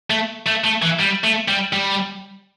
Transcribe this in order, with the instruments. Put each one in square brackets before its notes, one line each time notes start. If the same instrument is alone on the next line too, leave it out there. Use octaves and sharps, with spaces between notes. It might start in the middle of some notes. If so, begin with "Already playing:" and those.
[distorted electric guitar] A3
A3
A3
E3
G3
A3
G3
G3